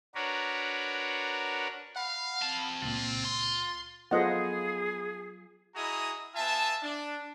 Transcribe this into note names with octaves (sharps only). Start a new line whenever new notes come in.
D4 F#4 A#4 B4 C#5
F5 F#5 B5
C4 A5
C#2 A#2 F4
C6
F#3 B3 F4 G#4 A4 C5 D#5 F#5
E4 F#4 G#4 D#5 A#5 D#6
B3 F4 E5 G#5 A5
D4